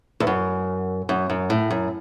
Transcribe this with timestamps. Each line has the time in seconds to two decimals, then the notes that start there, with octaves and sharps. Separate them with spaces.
0.20 E2
0.27 F#2
1.09 F#2
1.30 F#2
1.50 A2
1.71 F#2